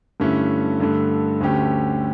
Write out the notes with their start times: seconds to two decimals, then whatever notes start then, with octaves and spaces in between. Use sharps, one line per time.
0.20 G2 D3 A3 C#4 E4
0.80 G2 D3 A3
1.40 D2 D3 A3 C#4 G4